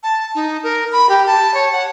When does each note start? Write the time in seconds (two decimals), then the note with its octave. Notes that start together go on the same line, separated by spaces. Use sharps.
0.03 A5
0.35 D#4
0.63 A#4
0.92 B5
1.09 G4
1.26 A5
1.54 C#5
1.72 F#5